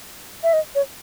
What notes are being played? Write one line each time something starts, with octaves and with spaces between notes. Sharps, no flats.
E5
D#5
C#5